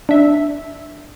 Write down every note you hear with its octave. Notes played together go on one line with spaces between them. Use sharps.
D4 E5